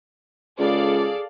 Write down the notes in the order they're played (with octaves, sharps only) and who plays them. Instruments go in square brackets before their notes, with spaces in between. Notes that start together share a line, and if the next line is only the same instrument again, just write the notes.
[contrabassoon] C#2 [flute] G#4 [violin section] A4 D5 F5